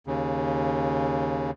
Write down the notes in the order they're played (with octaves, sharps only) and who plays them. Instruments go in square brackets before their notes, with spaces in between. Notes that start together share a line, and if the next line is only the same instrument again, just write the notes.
[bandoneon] D#2 C#3